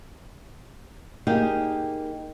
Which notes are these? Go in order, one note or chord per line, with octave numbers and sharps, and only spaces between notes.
A#3 D#4 G4 G#4 A#4